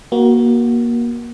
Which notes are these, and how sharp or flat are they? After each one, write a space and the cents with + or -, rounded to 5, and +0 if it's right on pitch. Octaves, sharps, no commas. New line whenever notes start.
A#3 +25 F#4 +10